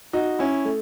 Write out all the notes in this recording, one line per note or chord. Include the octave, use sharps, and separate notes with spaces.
D#4 F#4
C#4 E4
A3